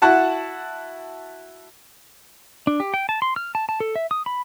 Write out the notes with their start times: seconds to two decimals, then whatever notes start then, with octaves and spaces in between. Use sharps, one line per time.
0.02 E4 F#4 F#5 A5
2.67 D4
2.80 G4
2.94 G5
3.09 A5
3.22 C6
3.36 F6
3.55 A5
3.69 A5
3.80 A4
3.96 E5
4.11 D#6
4.26 B5